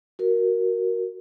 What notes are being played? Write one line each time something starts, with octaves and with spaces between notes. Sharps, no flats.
F#4 A#4